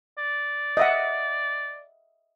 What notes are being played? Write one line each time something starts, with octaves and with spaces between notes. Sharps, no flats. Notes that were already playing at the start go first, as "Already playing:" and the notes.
D5
D#5 E5 F#5